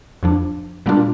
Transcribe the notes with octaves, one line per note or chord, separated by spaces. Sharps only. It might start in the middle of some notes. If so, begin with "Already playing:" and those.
F2 F3 D4
A#2 G3 A#3 D4 F4